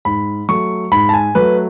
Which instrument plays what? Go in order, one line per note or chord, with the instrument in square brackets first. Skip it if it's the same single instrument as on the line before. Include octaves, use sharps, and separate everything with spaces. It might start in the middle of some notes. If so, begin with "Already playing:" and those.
[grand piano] G#2 B5
F#3 A3 C#6
G#2 B5
A5
G#5
F#3 A3 B4